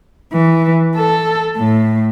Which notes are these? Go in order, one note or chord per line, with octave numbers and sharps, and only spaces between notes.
E3
A4
A2